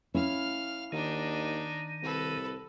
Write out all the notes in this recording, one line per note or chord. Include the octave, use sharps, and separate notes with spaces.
C#4 E4 F5 F6
D#2 D#3 D4 D#4
C2 A4 B4